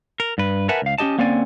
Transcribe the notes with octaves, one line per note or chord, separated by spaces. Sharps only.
A#4
G2 B4
A#4 B4 E5 F#5 G#5 A5
C#2 F5
C#4 D#4 G4 D#5 A5
D3 A#3 C4 C#4 D5 G#5